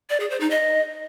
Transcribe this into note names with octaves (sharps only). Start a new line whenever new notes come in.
D5
G#4
C5
D#4
D#5